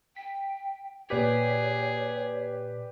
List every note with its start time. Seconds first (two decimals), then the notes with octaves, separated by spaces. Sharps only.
0.16 G5 B6
1.10 A#2 G4 G#4 B4 C#5 D5 B6